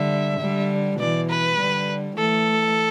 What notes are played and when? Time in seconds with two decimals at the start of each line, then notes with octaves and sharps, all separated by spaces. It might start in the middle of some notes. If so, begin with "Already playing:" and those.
Already playing: D3 G3 E5
0.40 D3 G3
0.98 B2 E3 D5
1.29 B4
1.58 D3 G3
2.17 E3 A3 A4